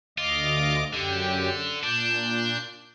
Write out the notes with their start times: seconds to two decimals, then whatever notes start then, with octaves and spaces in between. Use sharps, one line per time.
0.18 D2 F4 D#5 D6
0.93 F#2 D3 G4
1.83 A#2 D4 G6